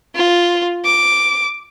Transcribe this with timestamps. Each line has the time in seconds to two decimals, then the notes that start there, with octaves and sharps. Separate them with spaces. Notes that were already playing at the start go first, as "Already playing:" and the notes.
0.15 F4
0.85 D6